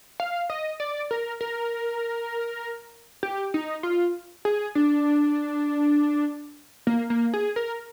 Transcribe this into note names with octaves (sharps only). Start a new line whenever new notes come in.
F5
D#5
D5
A#4
A#4
G4
D#4
F4
G#4
D4
A#3
A#3
G#4
A#4